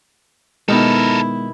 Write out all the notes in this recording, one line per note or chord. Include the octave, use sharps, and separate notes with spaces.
B2 D#3 G#3 B3 E4 A4 A#4